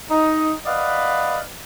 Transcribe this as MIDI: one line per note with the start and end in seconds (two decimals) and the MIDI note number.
0.11 0.50 63
0.66 1.38 71
0.66 1.38 74
0.66 1.38 75
0.66 1.38 77
0.66 1.38 78
0.66 1.38 83